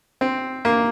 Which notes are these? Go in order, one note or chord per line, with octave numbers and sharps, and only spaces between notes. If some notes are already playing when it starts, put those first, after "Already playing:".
C4
A#3